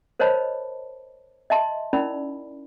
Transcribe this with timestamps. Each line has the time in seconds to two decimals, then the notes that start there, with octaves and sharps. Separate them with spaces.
0.19 A#4 C5 C#5 D#5 A5 B5
1.50 D#5 E5 A5 C6
1.93 C#4 D#4 E4 A#4 D5 B5